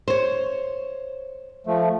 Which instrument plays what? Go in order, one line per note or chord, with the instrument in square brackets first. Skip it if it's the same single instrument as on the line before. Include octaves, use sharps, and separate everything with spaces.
[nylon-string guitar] C5 C#5
[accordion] F3 A3